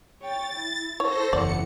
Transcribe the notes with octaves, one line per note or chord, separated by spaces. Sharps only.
C#5 G5 A6
E4
A4 C5 C#5 A#6
F#1 E2 E4 D5 F#5 C#7